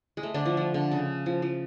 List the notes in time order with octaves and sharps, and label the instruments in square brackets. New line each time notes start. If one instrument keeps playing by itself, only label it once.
[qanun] G#3
A3
D3 D4
F3
F3
D3
C#3
F3
F3